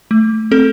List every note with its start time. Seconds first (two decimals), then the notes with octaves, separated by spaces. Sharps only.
0.11 A3
0.51 C4 A4